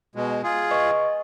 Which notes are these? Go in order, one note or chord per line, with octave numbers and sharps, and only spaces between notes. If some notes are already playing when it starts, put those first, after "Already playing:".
B2 G#3
F4 G#4
B4 D#5 C#6